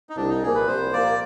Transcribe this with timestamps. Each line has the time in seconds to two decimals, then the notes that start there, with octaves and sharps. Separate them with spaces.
0.09 D#4
0.17 C2 D4
0.30 D#4
0.42 A#2 F3 A#3 G#4
0.55 B4
0.67 C2 C5
0.93 A#2 F3 A#3 D5